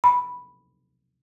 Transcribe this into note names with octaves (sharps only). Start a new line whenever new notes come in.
B5